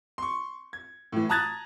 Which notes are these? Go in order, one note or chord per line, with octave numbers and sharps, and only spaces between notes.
C6 C#6
G#6
A2 E3
A5 A#5 D#6 F#6 G#6 A6